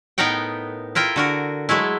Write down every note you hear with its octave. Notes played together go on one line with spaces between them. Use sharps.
A2 B3 D#4 A#4 F#5 G5
E4 F4 A#4 G5
D3 F#4 A#4
F#3 G#3 A3 E4